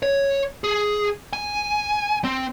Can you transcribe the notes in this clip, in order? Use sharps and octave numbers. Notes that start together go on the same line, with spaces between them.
C#5
G#4
G#5
C4